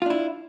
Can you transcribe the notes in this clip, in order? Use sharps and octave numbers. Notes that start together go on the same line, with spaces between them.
D4 E4 F4